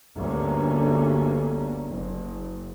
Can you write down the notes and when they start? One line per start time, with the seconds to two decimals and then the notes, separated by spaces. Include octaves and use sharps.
0.16 G1 D2 G2 G3 A#3 C#4
1.88 F#1